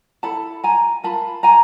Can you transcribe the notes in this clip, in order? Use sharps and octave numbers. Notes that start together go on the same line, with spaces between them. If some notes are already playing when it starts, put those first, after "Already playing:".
E4 A4 A5 B5
G#5 A#5
F4 A#4 A5 B5
G#5 A#5